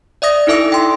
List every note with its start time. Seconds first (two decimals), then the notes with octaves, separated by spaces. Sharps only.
0.22 D5 E5 D#6 A#6
0.47 D#4 E4 A4 E5 D6 E6
0.72 G5 C6